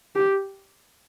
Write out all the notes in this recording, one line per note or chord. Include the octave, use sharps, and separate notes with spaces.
G4